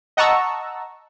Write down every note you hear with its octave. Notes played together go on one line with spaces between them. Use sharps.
D#5 F#5 A5 A#5 C#6 E6